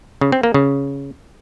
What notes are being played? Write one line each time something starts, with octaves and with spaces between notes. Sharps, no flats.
C#3
C4
A#3
C#3